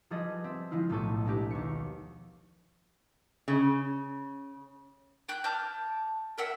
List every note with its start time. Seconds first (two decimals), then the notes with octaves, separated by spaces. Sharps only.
0.10 F3 G3 G#4 A4 B4 D#5
0.44 C4 E5
0.71 F3 G#3 E4 F4
0.89 B1 A2 A3 A4 C#6 D#7
1.26 G#3 D4 E4 G4 B4
1.50 D#2 C#6 C#7
3.48 C#3
5.28 G5 F#6 G6
5.44 A5 D6 F6 G6
6.38 A#4 E5 F#5